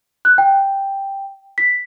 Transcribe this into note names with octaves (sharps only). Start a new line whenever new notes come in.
F#6
G5
B6